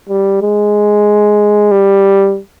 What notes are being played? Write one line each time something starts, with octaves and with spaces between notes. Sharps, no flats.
G3
G#3
G3